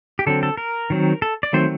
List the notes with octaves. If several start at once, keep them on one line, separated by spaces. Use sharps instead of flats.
G4
D3 F#3 C4 A4
A4
A#4
D#3 F#3 C4
A4
D5
D#3 F#3 A3 C4 C5